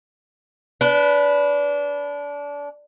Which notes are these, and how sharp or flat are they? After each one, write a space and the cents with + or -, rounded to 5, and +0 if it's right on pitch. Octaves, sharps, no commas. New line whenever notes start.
D4 -25 B4 +0